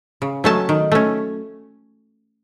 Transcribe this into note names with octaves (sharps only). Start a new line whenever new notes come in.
C#3
F#3 A3 C#4 A5
D#3
A3 C#4